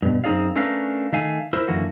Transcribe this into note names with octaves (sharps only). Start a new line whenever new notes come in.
G2 B2
F#2 C4 D#4 G#4 D5 F5
A3 C#4 D4 A#4 B4 F5
D#3 A3 F5 G#5
E4 A#4 C5
F#2 D3 E3 A#3 F#4